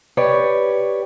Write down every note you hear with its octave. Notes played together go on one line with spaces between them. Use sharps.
G4 B4 C#5 D5